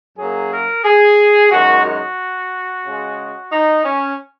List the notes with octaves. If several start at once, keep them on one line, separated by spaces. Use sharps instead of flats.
F#2 F#3 A#3 G#4
A#4
G#4
F#2 D#3 G#3 F#4
F#4
C#3 G#3
D#4
C#4